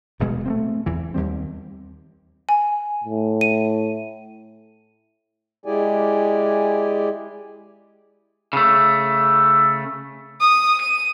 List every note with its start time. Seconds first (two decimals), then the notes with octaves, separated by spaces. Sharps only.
0.19 D#1 G2 B2 G#3
0.46 A3 A#3 C4
0.86 E2 E3
1.14 D#2 G3 C4
2.49 G#5
3.04 A2
3.41 D#7
5.66 G#3 E4 G4 G#4 D5 G#5
8.53 C#3 A3
10.41 D#6
10.81 D#7